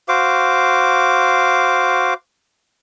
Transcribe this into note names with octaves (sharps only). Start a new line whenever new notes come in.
F#4 C5 F5 D6